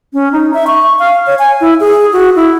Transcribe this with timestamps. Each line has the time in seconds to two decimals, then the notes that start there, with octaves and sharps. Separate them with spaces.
0.13 C#4
0.32 D#4
0.54 E5
0.67 C#6
0.99 F5
1.26 C#5
1.39 G#5
1.61 E4
1.80 G#4
2.13 F#4
2.36 E4